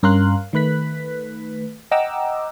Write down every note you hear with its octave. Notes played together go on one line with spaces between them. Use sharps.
G2 C#4 A#4 F5 C6 F#6
D#3 A3 B4 F#6 B6
D#5 F#5 G5 A#5 D6 E6